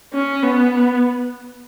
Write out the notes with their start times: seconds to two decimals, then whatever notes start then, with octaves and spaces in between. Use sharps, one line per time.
0.13 C#4
0.43 B3